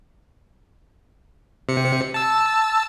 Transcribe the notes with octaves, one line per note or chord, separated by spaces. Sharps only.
C3 C#7
A5 E6